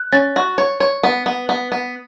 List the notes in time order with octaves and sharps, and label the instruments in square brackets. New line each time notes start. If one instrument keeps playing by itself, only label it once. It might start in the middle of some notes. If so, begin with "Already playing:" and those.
Already playing: [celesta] F#6
[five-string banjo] C#4 [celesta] A6
[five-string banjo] F#4
C#5
C#5
B3
B3
B3
B3